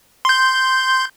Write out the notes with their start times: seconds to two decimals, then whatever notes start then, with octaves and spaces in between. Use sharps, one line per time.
0.25 C6 G6